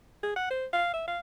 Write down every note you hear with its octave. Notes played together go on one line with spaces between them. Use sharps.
G#4
F#5
C5
F5
E5
F5